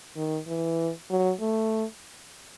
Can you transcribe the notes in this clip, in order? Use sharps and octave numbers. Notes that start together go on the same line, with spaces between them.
D#3
E3
F#3
A3